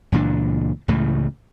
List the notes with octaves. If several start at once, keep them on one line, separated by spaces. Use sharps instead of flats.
C#2 A#2 E3 D4
C#2 A2 C#3 E3